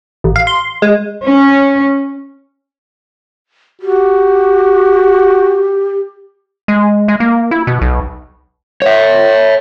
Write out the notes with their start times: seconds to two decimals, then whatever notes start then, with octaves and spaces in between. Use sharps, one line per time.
0.24 A1
0.36 F5
0.47 C6
0.82 G#3
1.24 C#4
3.82 F#4 G4
6.68 G#3
7.08 G#3
7.20 A#3
7.51 E4
7.67 B2
7.81 B1
8.82 C#5 E5